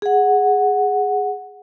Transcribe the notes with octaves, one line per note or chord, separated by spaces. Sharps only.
G#4 F#5